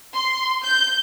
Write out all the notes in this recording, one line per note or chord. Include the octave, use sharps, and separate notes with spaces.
C6
G6